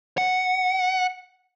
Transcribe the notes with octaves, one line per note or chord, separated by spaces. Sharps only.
F#5